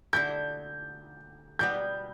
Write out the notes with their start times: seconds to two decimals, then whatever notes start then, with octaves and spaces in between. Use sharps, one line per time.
0.13 D3 A3 E4 G6
1.59 B2 G3 B3 G6